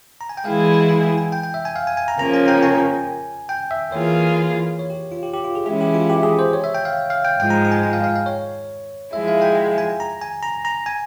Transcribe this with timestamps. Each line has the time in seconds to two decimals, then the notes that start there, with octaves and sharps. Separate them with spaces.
0.21 A#5
0.29 G#5
0.37 G5
0.45 E3 G#3 E4 G#4 F5
0.60 G5
0.74 G#5
0.90 G#5
1.03 G5
1.18 G#5
1.32 G5
1.43 G5
1.54 E5
1.65 G#5
1.76 F5
1.87 G#5
1.97 G#5
2.08 A#5
2.19 C#3 F3 A#3 C#4 A#5
2.34 G#5
2.48 G5
2.63 G#5
3.49 G5
3.71 E5
3.92 E3 A#3 F4 G#4 C#5
4.79 C#5
4.90 G4
5.12 F4
5.23 G4
5.33 G4
5.44 F4
5.55 G#4
5.66 E3 G#3 C#4 E4 G#4
5.81 G4
5.94 F4
6.10 G4
6.23 G#4
6.39 C5
6.53 C#5
6.64 E5
6.74 G5
6.85 F5
7.10 F5
7.25 G5
7.39 G#2 F3 G#3 G5
7.50 A#5
7.65 A#5
7.72 G#5
7.83 G5
7.93 F5
8.04 F5
8.16 F5
8.26 C#5
9.13 F3 G#3 E4 E5
9.28 F5
9.42 G5
9.78 G#5
10.00 A#5
10.21 G#5
10.43 A#5
10.65 A#5
10.86 G#5